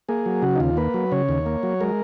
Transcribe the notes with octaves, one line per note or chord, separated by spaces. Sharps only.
A#3 G#4
F#3
C#3 F#4
D#4
D#2 F4
A#3 B4
F#3
C#3 C#5
D#2
A#3
F#3
G#3 A#4